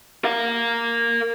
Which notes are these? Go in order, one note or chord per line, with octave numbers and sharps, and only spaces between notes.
A#4 F5